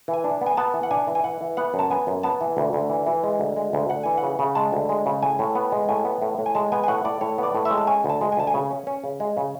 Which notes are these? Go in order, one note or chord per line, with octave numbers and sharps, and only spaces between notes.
E3
G#5
D4
B3
G#5
B3 A5
E3
F#5
D4 G#5
E3
G#5
E3 F#5
E3
B3 F#5
F#2
A5
B3 G#5
F#2
B3 A5
E3
D2
D2
E3
E3
G#3
D2
G#3
D2
D2 F#5
E3 G#5
F#5
C#3
C#3
G#3 A5
D2
G#3
C#3
A2 G#5
A2
B3
G#3
A2 G#5
B3
A2
A2
G#5
G#3 A5
B3 G#5
G#5
A2 F#5
A2 D5
A2 C#5
B3 D5
A2
E5
G#3
A5
C#4 G#5
D2
A5
G#3
G#5
D2 A5
G#5
C#3
C#4
C#4
C#3
G#3
C#3